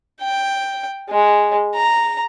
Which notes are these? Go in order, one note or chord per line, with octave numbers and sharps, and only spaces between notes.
G5
G#3
A#5